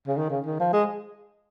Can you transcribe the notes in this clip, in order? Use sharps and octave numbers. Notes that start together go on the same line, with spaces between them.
C#3
D#3
C#3
D#3
F3
G#3